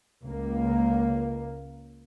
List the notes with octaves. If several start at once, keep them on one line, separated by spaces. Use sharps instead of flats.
C#2 A#3